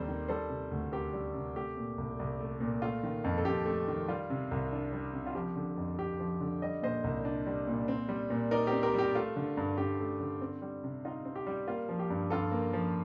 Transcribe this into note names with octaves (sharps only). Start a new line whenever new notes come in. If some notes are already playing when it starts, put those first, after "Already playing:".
Already playing: D#2 G3 C4 A4 C5
D#3
G3 A4 C5
C3
D2
C4 G4 A#4
G3
C3
A3 G4
A#2
C2
C2
A3
A#2
A3 F4
D#3
F2
A4
F2 G4
A3
D#3
G3 F4
C3
C2
D4
G3
C3
F4
F3 G4
D3
F2
F2 G4
F3
D3
G3 D#5
A#2 C5 D#5
C2
D4
G3
A#2
C4
G3
A#2
D#4 A#4 D5
G4 A#4
C4
G4 A#4
G3 G4
A3 F4
D3
G2
G2 G4
A3
D3
C4
G3
C3
D#4 F4
C4
G4
G3
A#3 F4
F3
G4
G2
G2 F4 A4
A#3
F3